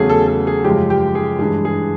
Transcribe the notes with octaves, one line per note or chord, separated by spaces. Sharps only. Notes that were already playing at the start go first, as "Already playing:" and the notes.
Already playing: E2 C#3 F#3 A3 G#4
A4
A4
G#4
F#2 C#3 F3 G#3 G4
G4
G#4
G2 E3 G#3 G#4
G#4